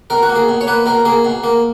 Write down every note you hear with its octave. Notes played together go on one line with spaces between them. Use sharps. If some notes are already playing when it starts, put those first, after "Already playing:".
B2 A#4
F#4
A#3
G#4
B2
C#5
A#3 B4
B2 A#4
A#3 G#4
B2
A#3